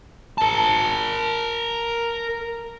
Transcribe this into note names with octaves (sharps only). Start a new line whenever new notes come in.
A#4 A5